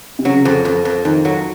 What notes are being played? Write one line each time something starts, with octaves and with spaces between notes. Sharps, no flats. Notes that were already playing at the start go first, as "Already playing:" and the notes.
C3
C#3 F#3
F2
F2
F2
F2 D#3
F#3